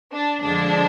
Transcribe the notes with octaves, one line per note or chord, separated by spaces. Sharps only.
D4
F2 D3 F3 G#3 D4